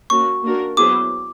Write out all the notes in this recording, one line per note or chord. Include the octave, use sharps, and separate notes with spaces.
A#3 C#4 F#4 C#6
A#3 D4 F#4 A#4
F#3 B3 E4 G#4 C5 D6